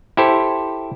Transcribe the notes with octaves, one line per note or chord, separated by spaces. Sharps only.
E4 G4 A4 C5